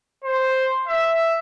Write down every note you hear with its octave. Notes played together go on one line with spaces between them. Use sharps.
C5
E5